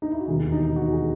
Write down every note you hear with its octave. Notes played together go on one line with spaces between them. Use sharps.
D#4
E4
F#4
E1 D#2 D#3 G#4
D#4
F#4
G#4